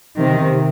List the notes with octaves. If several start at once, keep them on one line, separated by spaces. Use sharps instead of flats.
C3 D#3